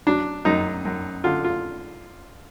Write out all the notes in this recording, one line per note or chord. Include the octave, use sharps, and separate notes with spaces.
F#3 D4
F#2 D#4
F#2
D3 F4
F4